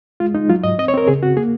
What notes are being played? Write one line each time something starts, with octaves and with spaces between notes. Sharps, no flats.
G#3 F4
G#3 D#4
F#3 F4
G#2 D#5
C4 D#5
C#5
C4 A#4
C#3 G#4
C4 F#4
A#3 G#4